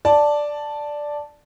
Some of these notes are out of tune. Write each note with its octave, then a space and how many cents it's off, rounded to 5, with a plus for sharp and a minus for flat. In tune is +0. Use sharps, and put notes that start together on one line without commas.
D5 +0 A5 +0